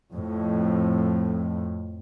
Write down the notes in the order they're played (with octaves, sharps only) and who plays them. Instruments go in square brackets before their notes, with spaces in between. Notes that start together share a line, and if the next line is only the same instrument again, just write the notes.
[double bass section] F2 A2